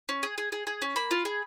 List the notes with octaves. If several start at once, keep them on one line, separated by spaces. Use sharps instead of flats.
C#4
G#4
G#4
G#4
G#4
C#4
A#3 B5
F4
G#4